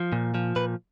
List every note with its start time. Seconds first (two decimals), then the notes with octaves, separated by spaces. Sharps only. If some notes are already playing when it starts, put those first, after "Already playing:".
Already playing: F3
0.12 A#2
0.34 F3
0.56 A#2 B4